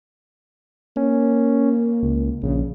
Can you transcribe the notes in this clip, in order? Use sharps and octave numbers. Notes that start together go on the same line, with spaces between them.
A#3 C#4
C#2
A#1 C#3